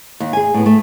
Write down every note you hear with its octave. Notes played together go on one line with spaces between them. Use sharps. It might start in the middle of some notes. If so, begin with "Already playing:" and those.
D#2
G#4 G#5
A2 B3
A3